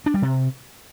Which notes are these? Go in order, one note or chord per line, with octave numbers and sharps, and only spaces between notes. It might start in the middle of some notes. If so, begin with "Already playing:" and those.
D4
G3
C3